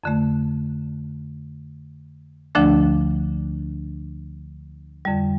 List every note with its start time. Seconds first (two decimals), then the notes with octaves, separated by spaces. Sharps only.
0.04 F2 D3 A3
2.55 D2 D3 F3 A3 D4
5.05 F2 D3 G3